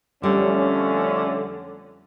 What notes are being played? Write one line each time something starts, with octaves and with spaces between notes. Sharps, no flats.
F2 D3 G3 A3 C#4